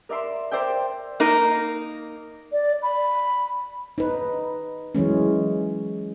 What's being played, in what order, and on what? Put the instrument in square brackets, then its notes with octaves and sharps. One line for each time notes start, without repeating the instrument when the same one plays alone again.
[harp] A#4 D5 E5 C6
A#4 C5 D5 E5 G5
[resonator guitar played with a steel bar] A#3 D#4 A#4
[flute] D5
B5
[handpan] D#4 B4
E3 F#3 G#3 C#4